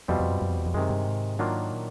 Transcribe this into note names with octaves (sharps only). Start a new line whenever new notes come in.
F2 B2 G3 C4 F4
F2
F#2
F#2
F2
E2
F2
F#2 C3 D#3 G#3
G2
G#2
D#3 F#3 A#3 D4 F4
A#2